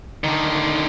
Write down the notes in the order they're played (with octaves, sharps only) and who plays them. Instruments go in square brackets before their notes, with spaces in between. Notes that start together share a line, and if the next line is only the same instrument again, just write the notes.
[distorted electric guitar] D3 D#3